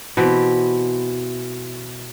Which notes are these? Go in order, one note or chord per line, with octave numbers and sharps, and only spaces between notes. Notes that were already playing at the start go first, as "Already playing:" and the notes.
B2 E3 C4 G4